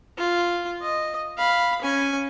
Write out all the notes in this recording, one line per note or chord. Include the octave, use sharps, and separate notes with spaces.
F4
D#5
F5 B5
C#4 G#5